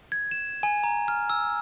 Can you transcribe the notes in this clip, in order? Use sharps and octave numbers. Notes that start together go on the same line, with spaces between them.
G#6
E7
G#5
A#5
F6
E6